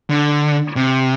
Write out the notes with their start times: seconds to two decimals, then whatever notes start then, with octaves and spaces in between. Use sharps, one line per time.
0.10 D3
0.76 C3